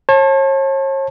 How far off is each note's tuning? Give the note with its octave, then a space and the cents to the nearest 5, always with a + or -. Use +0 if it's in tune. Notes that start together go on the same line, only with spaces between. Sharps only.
C#5 -40 A5 +0